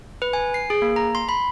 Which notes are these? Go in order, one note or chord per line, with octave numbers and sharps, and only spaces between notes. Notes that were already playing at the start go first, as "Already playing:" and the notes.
B4
G#5
C7
G#4
A#3
A#5
C6
B5